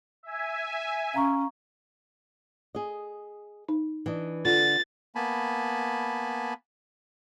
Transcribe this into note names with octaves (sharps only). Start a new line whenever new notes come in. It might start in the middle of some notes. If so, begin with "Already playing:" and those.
E5 G#5
C#4 F5 A#5 C#6
G#4 D#5
D#4
E3 D4 D#5
D3 F4 A6
A#3 B3 G#5 A5 B5